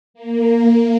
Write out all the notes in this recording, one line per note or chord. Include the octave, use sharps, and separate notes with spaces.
A#3